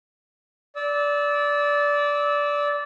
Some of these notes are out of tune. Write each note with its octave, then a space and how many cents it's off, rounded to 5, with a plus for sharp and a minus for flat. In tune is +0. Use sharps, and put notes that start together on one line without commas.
D5 -15 E6 -25